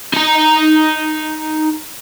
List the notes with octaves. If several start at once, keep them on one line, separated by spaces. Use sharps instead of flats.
D#4 A#5